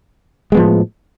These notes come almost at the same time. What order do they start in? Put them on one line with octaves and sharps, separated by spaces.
G#3 B3 F3 A2